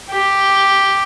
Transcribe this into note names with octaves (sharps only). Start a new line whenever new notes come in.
G4